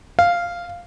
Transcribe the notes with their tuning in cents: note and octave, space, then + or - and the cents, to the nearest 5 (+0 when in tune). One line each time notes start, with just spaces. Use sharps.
F5 -5